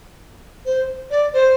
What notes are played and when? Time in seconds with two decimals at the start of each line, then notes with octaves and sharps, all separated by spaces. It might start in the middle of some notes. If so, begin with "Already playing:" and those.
0.65 C5
1.10 D5
1.33 C5